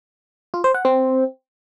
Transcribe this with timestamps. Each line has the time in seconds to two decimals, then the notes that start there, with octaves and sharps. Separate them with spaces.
0.54 F4
0.64 C5
0.74 F#5
0.85 C4